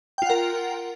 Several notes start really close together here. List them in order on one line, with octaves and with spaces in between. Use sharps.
G5 F4 F#5 A#4